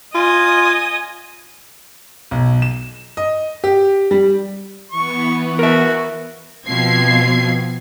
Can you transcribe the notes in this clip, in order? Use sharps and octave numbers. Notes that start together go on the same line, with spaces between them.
F4 D#5 G#5 D#6
B1
E7
D#5
G4
G3
E3 B3 C#6
F#4 A#4 E5
B2 F3 C4 G#6 C7